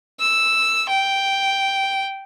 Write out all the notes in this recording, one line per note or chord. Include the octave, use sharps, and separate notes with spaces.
E6
G5